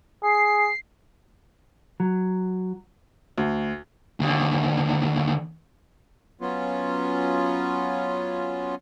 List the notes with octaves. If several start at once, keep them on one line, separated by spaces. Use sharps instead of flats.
G#4 C7
F#3
D2
D#2 D3
F#3 B3 C#4 F4